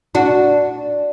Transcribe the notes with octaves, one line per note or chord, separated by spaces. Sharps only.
D4 F#4